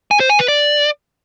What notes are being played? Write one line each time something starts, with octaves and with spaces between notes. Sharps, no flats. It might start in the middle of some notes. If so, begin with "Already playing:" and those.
G#5
C5
G#5
B4
D5